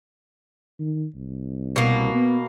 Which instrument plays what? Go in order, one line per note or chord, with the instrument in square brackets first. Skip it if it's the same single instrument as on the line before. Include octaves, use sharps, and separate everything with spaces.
[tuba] D#3
C2
[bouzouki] B2 A#3
[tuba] B3